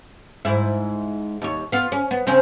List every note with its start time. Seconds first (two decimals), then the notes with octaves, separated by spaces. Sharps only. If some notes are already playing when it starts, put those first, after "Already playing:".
0.45 G#2 E4
1.42 D#2 C#5
1.72 B3 F4
1.92 C#4
2.11 B3
2.27 C#3 C4 C#4